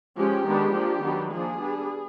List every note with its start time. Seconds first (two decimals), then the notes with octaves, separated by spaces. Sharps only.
0.17 F3 G#3 C#4 G4
0.45 D#3 G#3 B3 D4
0.74 F3 A#3 D4
1.03 D#3 F#3 B3 D4
1.32 F3 A#3 D4 G#4
1.60 G3 B3 D4